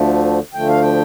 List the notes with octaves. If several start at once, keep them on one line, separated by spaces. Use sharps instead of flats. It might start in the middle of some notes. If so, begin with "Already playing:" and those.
Already playing: D2 D3 F3 A3
D2 D3 F3 A3 G5
F5
G5